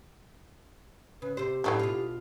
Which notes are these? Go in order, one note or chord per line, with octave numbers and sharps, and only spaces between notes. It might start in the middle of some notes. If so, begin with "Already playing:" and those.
C#3 B4
C3 G4 C5
F#2 A2 E3 A3 D4 F5
B2 F4